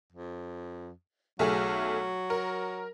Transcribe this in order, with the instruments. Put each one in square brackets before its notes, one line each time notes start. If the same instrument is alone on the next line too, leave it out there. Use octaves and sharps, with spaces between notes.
[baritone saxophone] F2
[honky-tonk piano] B1 A3 G#4 [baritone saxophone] F#3
[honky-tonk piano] A#4